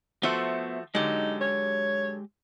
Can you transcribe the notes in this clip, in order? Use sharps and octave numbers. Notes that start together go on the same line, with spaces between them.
F3 A3 B3 F#4 C5 E5
D3 F#3 G#3 D#4 G4
C#5